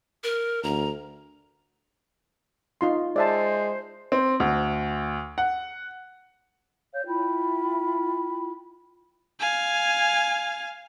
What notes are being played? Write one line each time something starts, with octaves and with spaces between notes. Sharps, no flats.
A#4
D2 A#5
D#4 F4 C6
G#3 C5 D5 E5 A5
C4
D2
F#5
C#5 F5 G6
E4 F4 G5 B5
F5 G#5